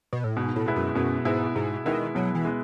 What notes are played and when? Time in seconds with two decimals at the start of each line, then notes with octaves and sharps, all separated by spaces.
0.13 B2
0.24 A2
0.37 G#2 B2
0.56 A2
0.66 G#3 B3 E4
0.76 F#2
0.95 F#2 B2
1.25 G#2 G#3 B3 E4
1.55 G#2 B2
1.85 D#3 G#3 B3 E4
2.15 B2 F#3
2.35 E3
2.45 G#3 B3